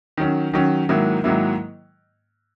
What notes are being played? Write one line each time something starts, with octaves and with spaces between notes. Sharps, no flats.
D#3 F#3 C#4
D#3 F#3 C#4
G#2 D#3 F#3 A#3 E4
G#2 D#3 F#3 A#3 E4